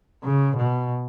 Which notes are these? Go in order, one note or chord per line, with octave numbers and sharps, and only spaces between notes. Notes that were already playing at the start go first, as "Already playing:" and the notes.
C#3
B2